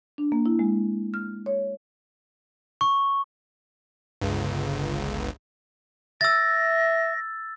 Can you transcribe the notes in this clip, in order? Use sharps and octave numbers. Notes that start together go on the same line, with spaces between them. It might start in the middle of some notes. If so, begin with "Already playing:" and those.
D4
A#3
E4
G#3
F6
C#5
C#6
G1 C#2
E5 E6 A6 A#6